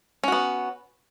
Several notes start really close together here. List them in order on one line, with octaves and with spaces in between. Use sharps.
C#4 F#4 B3